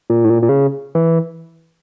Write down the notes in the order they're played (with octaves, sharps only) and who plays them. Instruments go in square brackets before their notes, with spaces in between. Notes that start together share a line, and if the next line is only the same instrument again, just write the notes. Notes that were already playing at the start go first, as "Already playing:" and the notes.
[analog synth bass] A#2
A2
A#2
A#2
C#3
E3